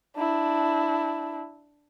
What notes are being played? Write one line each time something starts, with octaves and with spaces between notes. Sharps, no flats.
D4 E4